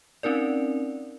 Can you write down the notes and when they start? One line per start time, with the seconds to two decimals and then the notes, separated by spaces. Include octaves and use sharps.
0.23 C4 C#4 D#4 A#4 D5